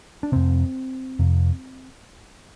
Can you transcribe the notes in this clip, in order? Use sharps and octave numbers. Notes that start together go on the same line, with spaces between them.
D4
F2 C3 C4
F2 C3